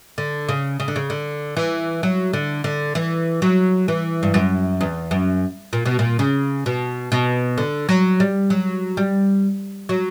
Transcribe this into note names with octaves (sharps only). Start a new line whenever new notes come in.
D3
C#3
C#3
D3
C#3
D3
E3
F#3
D3
D3
E3
F#3
E3
G2
F#2
E2
F#2
A#2
B2
A#2
C#3
B2
B2
D3
F#3
G3
F#3
G3
F#3